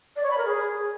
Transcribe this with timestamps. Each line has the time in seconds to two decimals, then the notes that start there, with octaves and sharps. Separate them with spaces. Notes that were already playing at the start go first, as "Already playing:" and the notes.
0.16 D5
0.23 C#5
0.31 B5
0.38 A#4
0.45 G#4